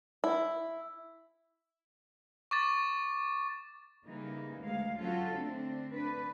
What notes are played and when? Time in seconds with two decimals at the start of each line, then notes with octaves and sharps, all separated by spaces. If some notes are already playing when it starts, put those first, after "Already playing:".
0.24 E4
2.51 C#6 D6 A6
4.06 C#3 E3 G3 A#3 D#4
4.62 D2 G#3 F5
4.98 F#3 C#4 F4 F#4 A4
5.35 D3 A3 C4 D4
5.93 D4 B4